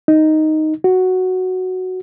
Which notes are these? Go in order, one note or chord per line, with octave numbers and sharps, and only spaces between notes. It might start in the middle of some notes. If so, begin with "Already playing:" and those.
D#4
F#4